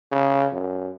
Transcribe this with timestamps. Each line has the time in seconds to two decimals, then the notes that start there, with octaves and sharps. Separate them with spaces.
0.12 C#3
0.53 F#2